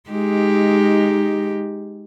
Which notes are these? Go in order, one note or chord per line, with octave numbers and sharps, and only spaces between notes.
G#3 D#4 G4